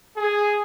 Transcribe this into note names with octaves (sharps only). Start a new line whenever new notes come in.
G#4